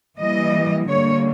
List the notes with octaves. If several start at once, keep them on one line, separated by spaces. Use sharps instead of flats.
E3 G3 A#3 D#5
D3 G3 A#3 C#5